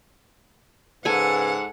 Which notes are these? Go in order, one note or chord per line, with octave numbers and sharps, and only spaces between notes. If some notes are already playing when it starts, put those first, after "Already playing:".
G#2 C#3 A4 B4 F#5 G#5